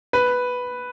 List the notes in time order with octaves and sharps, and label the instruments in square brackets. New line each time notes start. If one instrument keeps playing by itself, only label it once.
[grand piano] B4